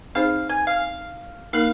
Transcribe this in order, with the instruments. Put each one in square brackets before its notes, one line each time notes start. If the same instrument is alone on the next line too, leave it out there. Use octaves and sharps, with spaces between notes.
[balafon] C4 D#4 G#4 C5 [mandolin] F5
[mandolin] G#5
F5
[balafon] A#3 D#4 A#4 [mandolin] F5